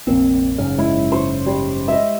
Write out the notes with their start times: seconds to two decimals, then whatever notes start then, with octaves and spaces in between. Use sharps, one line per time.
0.07 F1 A#1 A#3 C4
0.58 F#1 G#2 C#3 F6
0.79 G#3 E4
1.12 C5 C#6 D#6
1.46 G3 G#3
1.88 G#3 D#5 E5